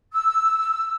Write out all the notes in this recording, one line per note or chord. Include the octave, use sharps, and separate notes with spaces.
E6